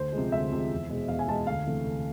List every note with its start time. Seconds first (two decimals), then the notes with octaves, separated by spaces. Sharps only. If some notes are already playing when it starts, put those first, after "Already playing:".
Already playing: D2 C5
0.13 C3 F3 G#3
0.32 D2 E5
0.52 C3 F3 G#3
0.71 E2
0.89 B2 G#3
1.08 E2 F5
1.19 G#5
1.28 B2 G#3 A5
1.47 D2 F5
1.66 C3 E3 A3
1.85 D2